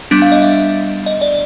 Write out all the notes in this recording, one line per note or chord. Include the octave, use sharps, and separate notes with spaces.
G3 B3 D4
F5
D#5
E5
D#5
D5